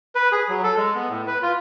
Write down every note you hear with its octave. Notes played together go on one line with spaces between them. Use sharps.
B4
G#4
F#3
A4
G#3
B3
A2
B4
F4